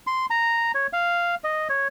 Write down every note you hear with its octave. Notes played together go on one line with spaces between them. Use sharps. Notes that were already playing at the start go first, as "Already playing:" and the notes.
C6
A#5
C#5
F5
D#5
C#5